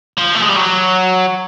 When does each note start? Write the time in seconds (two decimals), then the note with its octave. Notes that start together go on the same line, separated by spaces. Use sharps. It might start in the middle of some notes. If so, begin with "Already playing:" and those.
0.18 F3
0.36 A3
0.43 G#3
0.50 G3
0.56 F#3